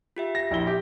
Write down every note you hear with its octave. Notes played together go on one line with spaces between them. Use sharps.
F4 G4 E5
A#6
A#1 E4 G7
G4